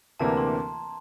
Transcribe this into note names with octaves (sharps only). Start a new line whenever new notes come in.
D2 C3 E3 A#3 D4 A5
A#5
C6